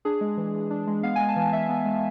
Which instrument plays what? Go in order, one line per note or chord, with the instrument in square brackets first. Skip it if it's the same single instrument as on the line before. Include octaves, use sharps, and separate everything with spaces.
[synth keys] D4 G#4
G#3
E3
E3
D4
G#3
B3 F5
G#3 G#5
A5
E3
E3 E5
B3
G#3